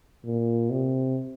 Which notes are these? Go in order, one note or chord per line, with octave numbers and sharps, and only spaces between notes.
A#2
C3